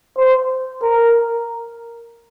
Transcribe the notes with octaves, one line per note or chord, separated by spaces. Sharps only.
C5
A#4